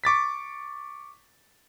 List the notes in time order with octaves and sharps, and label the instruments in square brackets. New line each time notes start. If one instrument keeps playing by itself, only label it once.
[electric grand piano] C#6 D6 A6 B6